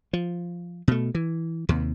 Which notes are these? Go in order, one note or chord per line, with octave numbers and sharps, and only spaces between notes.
F3
B2 A3
E3
D#2 C3